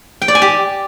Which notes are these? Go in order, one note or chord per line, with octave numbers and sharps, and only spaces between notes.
G5
D5
G#5
G4